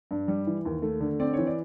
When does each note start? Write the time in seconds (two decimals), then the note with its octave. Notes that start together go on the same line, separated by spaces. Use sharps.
0.11 G2
0.28 G3
0.47 E3
0.65 D#2
0.82 A3
1.00 D3
1.20 C4 D5
1.33 E3 C#5
1.47 D5